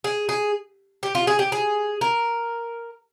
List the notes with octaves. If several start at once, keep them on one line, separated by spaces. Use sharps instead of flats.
G#4
G#4
G4
F4
G#4
G4
G#4
A#4